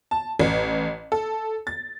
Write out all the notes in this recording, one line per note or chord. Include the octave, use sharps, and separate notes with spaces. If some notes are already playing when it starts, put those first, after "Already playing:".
A5
A1
A4
A6